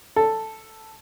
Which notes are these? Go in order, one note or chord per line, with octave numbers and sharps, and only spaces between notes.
A4